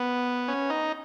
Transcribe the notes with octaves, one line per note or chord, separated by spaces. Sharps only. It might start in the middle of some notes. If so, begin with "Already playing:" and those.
Already playing: B3
C#4
D#4